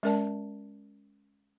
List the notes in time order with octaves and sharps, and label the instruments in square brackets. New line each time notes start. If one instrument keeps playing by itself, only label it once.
[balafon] G#3 C#4 A#4 D5 A5